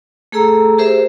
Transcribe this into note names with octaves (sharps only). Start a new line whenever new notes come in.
A3 G#4 A4 A#5 E6
G4 G#4 A#4 C5 E5